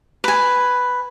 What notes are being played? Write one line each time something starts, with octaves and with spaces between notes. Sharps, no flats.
B4 G#5